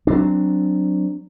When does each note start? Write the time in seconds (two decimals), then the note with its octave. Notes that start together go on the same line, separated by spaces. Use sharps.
0.07 F#3 C4 D4